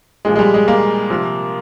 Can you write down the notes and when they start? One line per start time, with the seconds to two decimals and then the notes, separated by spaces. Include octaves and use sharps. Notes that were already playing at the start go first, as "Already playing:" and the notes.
0.25 A#2 F3 G#3
0.36 G#3
0.39 G3
0.54 G#3
0.68 A#3
1.10 C3 F3